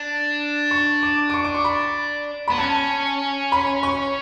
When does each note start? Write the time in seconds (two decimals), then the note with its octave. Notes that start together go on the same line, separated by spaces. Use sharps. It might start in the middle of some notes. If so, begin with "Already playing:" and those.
Already playing: D4
0.71 C#6
1.03 D6
1.30 D6
1.34 C#6
1.44 D6
1.55 C#6
1.64 B5
2.48 B3 B5
2.58 C#4 A5
3.52 B5
3.83 C#6